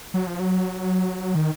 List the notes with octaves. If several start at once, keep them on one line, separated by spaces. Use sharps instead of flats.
F#3
F3
F#3
D#3